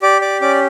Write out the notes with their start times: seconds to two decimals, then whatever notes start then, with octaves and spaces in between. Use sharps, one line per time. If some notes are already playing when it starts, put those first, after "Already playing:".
0.02 G4 D5 D6
0.21 D5 D6
0.41 C#4 D5 D6